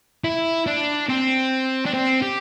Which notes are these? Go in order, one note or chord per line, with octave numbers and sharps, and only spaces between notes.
E4
D4
C4
D4
C4
G4